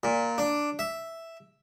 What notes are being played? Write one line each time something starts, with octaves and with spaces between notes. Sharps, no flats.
A#2
D4
E5